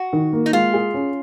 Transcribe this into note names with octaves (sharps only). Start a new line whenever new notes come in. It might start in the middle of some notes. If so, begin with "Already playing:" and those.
Already playing: F#4
D#3
A#3
D#4
G#3 F4
G#4
C#4